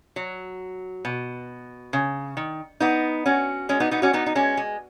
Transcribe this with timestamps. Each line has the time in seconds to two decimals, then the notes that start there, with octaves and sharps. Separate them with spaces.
0.16 F#3
1.05 B2
1.93 C#3
2.37 D#3
2.80 B3 D#4
3.26 C#4 F#4
3.69 G#3 C#4
3.80 B3 D#4
3.91 B3 D#4
4.02 C#4 F#4
4.13 B3 D#4
4.26 D#4
4.35 G#3 C#4
4.57 G#3